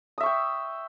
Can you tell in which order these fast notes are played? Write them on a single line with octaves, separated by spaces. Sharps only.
D#6 E5 C#6 G5